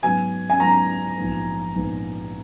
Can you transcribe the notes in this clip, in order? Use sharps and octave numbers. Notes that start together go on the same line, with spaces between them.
G#2 F#3 B3 G#5
G#5
G#2 F#3 B3 A#5
A#1 G#2 F3 B3
A#1 G#2 F3 B3